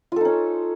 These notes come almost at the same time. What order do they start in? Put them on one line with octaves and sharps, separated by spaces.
F4 A4 D#4 C#4